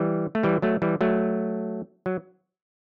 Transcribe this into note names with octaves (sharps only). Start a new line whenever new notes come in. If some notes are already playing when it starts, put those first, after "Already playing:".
Already playing: E3 G3
A3
E3 G3
F#3 A3
E3 G3
F#3 A3
F#3